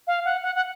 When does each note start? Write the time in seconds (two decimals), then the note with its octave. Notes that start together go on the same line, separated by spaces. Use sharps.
0.07 F5
0.25 F#5
0.43 F#5
0.55 F#5